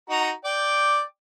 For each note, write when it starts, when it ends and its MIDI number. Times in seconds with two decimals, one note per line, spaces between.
0.10 0.31 63
0.10 0.31 66
0.10 0.31 82
0.45 1.02 74
0.45 1.02 79
0.45 1.02 86